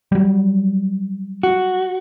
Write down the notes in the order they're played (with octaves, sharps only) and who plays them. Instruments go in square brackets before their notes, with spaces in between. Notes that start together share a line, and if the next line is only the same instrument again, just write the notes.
[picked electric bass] F#3 G3
[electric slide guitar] F#4